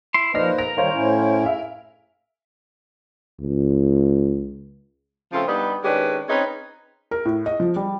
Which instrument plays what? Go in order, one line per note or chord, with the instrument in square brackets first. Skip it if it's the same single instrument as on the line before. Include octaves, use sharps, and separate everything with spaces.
[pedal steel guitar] E4 C6
[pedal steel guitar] F3 F6 [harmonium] A#3 B4 C5 [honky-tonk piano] D#4 D5 A#6
[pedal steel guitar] A#4 [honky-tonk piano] A#6
[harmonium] D#3 G3 [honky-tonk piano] C5 C#5 F5
[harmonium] A2 C#4 E4
[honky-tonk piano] E5 F5 G#5
[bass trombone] C#2
[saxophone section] C#3 F3 A3 C4 F4
G3 B3 D4 D#4 B4 D5
D#3 G#3 C#4 D4 G4 B4
C4 C#4 D#4 G#4 B4 C#5
[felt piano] A#4
A2
D#5
F3
G3